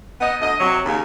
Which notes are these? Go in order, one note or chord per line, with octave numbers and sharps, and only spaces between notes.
B3 D#5
D2 D#5
C3 F#3
D#2 C#3